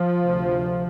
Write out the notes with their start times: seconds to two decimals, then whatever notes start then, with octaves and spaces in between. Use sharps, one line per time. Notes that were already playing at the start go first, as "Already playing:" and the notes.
Already playing: F3
0.21 D2 C3